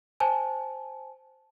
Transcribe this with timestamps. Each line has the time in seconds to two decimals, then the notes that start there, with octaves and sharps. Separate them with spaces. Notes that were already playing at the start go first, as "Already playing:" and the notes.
0.20 C5 G#5 A5